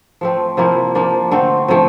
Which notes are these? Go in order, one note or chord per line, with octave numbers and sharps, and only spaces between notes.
F3 A3 C4
C3 F3 A#3 E4
F3 A#3 D4
D3 A3 C4
C3 F3 A3